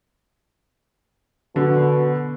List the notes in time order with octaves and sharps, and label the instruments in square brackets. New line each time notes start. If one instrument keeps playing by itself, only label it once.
[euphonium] B2 [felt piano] D3